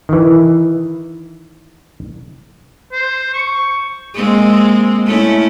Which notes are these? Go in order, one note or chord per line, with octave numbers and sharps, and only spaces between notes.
D#3 E3
C5
C#6
G#3 A#3 C4
A3 C#4 E4